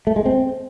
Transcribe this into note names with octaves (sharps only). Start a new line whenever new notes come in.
A3
G#3
C4